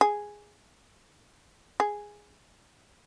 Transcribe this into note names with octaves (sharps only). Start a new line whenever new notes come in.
G#4
G#4